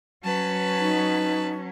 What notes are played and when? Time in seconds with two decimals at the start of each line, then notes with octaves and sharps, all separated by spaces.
0.24 F#3 C#4 B4 A5
0.79 D#4